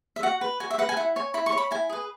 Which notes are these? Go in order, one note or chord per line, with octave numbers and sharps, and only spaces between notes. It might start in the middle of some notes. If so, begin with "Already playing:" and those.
E5
F#4 F#5
B4
F#4 G#5
E5
B4 F#5
G#5
E4 F#5
C#5 G#5
E4 B5
C#6
C#5
B5
E4 G#5
G#4 B4